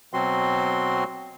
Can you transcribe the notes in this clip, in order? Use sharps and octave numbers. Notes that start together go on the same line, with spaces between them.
B2 F#3 C4 F#4 C6